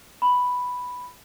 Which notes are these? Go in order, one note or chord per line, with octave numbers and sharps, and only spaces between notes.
B5